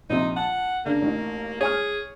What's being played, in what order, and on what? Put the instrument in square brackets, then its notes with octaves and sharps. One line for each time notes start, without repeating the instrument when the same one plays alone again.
[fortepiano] A#1 C3 [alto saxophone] D#4
[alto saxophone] F#5 [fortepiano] A5
[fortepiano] C#3 D4 [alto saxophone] A#3
[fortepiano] A1 D#4
[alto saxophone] G#4 [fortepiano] C#5 G#5 F6